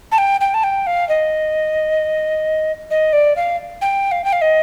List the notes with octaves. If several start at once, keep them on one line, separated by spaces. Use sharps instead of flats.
A5
G5
G5
A5
G5
F5
D#5
D#5
D5
F5
G5
F5
G5
F5
D#5